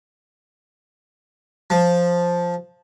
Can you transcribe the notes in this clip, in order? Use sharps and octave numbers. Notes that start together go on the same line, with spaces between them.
F3